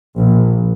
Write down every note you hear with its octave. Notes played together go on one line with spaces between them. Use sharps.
A#1 A#2